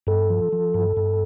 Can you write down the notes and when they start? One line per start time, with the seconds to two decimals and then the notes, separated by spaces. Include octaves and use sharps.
0.07 G2 A4
0.30 F3
0.53 F3
0.74 G2
0.97 G2